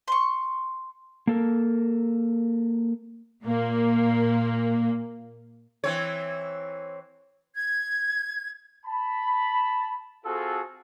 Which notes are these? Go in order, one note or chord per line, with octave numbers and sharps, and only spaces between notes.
C6 C#6
A#3 A4 A#4
A#2 A#3
E3 C4 C#5
G#6
A5 B5
C4 F4 F#4 G#4 A4